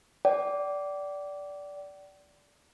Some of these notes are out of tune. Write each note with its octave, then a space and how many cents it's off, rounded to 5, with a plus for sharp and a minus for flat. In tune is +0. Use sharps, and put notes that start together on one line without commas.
D5 -15 G5 -45